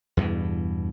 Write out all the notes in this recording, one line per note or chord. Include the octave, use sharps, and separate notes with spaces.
E2 G2 B2 E3